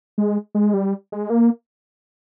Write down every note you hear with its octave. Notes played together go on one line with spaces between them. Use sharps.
G#3
G#3
G3
G#3
A#3